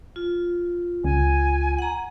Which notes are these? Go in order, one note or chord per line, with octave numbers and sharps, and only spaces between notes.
F4
C#2 G#5
F#5 A#5